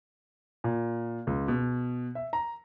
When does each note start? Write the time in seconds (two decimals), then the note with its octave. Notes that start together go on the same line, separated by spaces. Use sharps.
0.64 A#2
1.27 C#2
1.48 B2
2.15 E5
2.33 A#5